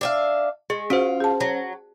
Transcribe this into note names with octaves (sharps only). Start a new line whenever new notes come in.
D4 E5 F5
G#3 G#4
C#4 F4 F#4 C5
G#4 A5
F#3